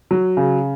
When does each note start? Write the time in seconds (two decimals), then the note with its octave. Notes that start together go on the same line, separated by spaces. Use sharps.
0.11 F#3
0.37 C#3